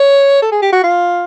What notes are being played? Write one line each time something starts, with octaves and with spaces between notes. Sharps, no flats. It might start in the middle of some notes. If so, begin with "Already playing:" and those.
Already playing: C#5
A4
G#4
G4
F#4
F4